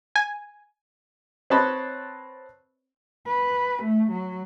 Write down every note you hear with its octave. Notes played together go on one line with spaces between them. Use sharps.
G#5
C4 B4 C#5 D#5 A5 B5
B4
A3
F#3